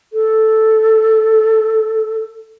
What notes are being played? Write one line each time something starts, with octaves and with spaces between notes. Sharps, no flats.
A4